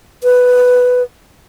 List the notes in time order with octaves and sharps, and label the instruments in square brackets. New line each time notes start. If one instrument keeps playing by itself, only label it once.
[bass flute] B4